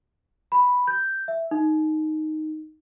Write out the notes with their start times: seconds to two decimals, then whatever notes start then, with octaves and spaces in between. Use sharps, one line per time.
0.52 B5
0.87 G6
1.28 E5
1.51 D#4